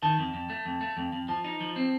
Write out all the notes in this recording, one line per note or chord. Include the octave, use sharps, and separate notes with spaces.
D#3 A5
F2
F2
A3
F2
A3
F2
F2
F3 A5
D#4
F3
C4